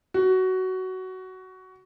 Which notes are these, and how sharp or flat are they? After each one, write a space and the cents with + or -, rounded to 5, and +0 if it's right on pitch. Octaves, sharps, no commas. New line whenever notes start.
F#4 +15